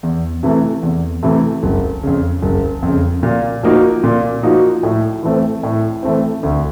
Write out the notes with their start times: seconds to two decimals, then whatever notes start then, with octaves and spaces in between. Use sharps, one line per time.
0.03 E2
0.43 C3 E3 A3
0.83 E2
1.23 C3 E3 A3
1.63 F#1
2.03 F2 C#3
2.42 F#1
2.82 F2
2.88 C#3
3.23 A#2
3.63 F3 A#3 D#4 F#4
4.04 A#2
4.43 F3 A#3 D#4 F#4
4.83 A2
5.23 E3 A3 C4
5.63 A2
6.03 E3 A3 C4
6.43 D2